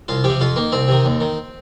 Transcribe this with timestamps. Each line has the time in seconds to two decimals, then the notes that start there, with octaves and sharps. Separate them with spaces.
0.08 C2 F4
0.24 C3 F3 G4
0.41 F2 F4
0.56 D#3 A#3
0.72 C2 C4
0.88 C3 D#3
1.05 D#2
1.21 D#3